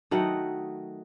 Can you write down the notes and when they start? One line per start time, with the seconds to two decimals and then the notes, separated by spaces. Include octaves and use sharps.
0.11 D#3 F#3 A3 D#4 F#5